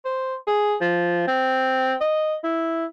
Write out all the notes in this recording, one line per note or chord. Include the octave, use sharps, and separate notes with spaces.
C5
G#4
F3
C4
D#5
E4